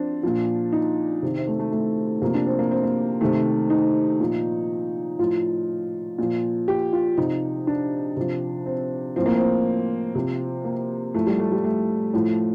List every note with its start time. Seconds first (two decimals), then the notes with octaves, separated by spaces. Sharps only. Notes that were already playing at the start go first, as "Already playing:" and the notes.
Already playing: F3 C4 D4
0.23 A#2 F3
0.73 D#4
1.23 C3 D#3
1.35 C4
1.47 A3
1.59 A3
1.72 A3
2.22 C3 F3 A#3
2.34 D4
2.46 C4
2.59 A#3
2.71 C4
2.83 A#3
3.21 C3 D#3 A3
3.70 D#4
4.20 A#2 F3
5.19 A2 F3 F4
6.18 A#2 F3
6.68 G4
6.93 F4
7.17 C3 F3 D#4
7.67 D4
8.17 C3 F3
8.66 C4
9.16 A2 F3 C4
9.26 A#3
9.35 C4
10.15 C3 F3
10.65 A#3
11.14 A2 F3 A3
11.27 G3
11.39 A3
11.52 G3
11.64 A3
12.14 A2 F3